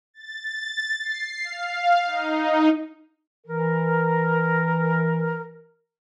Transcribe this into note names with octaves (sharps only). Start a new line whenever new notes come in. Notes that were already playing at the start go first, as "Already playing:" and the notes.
A6
C7
F5
D#4
E3 A#4